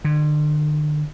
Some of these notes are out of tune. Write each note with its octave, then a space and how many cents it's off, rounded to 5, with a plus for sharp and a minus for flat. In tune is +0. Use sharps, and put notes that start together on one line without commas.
D3 +40